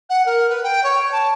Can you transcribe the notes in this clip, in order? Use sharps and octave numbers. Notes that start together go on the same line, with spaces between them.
F#5
A#4
B4
G5
C#5
A5